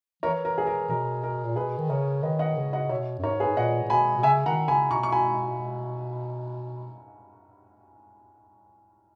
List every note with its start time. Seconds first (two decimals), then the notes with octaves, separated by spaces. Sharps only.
0.23 E3 A#4 C#5
0.45 A#4
0.58 G#4
0.67 A#4
0.89 B2 A#4
1.23 A#4
1.45 A#2
1.56 B2 G#4 B4
1.78 D#3
1.90 C#3 A#4 C#5
2.23 D#3 B4 D#5
2.39 D#5 F#5
2.56 C#3
2.73 D#5 F#5
2.89 B2 C#5 E5
3.19 F#2
3.23 G#2 A#4 C#5
3.40 G#4 B4
3.47 G#2
3.57 A#2 D#5 F#5
3.83 A#2
3.90 B2 G#5 B5
4.17 B2
4.23 C#3 E5 G#5
4.46 D#3 F#5 A#5
4.68 C#3 G#5 B5
4.90 B2 A#5 C#6
5.03 C#6
5.12 G#5 B5